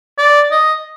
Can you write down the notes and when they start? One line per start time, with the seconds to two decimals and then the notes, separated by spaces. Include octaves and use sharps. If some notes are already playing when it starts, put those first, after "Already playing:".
0.18 D5
0.51 D#5